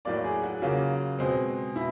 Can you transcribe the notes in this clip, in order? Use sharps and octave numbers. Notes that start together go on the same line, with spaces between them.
A2 F#3 A#3 D5
G#4
F#4
C#3 F#3 A#3 F4
B2 G#3 C4
B2 E4